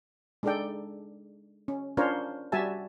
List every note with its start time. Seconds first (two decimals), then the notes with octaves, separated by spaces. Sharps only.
0.43 G#3 D4 D#4 A4 D5 G5
1.68 C#4
1.97 C#4 D4 F4 A#4 C5 C#5
2.52 G3 F#4 G4 E5 G#5 A5